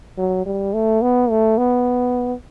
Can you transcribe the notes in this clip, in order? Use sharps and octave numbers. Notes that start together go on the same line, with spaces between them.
F#3
G3
A3
B3
A3
B3